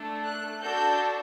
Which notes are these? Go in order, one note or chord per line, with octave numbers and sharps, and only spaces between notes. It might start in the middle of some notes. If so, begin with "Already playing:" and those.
Already playing: A3 D4 A4
F#6
D4 F#4 A4 G6